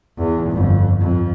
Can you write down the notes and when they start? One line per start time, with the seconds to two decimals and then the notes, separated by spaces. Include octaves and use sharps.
0.18 E2
0.50 G1 F2
1.00 F2